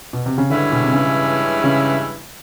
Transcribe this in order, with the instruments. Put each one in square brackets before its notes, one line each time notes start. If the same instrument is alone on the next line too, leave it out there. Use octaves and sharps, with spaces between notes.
[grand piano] B2
C3
C#3
[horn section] G2 E3 G#3 C#4 E4 [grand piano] D3
[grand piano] B2
C3
C#3
C#3